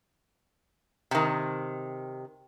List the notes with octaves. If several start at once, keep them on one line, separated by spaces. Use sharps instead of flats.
C3 D#3